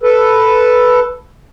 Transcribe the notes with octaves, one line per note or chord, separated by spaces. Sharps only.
A4 B4